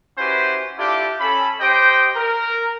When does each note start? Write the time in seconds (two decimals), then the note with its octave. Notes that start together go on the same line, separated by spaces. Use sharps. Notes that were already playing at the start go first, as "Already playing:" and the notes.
0.18 C#4 E4 F#4 G4 B4 C5
0.78 D4 E4 F4 G4 A4 D5
1.21 C#4 A4 B5
1.61 G4 C5 D#5 G5
2.16 A#4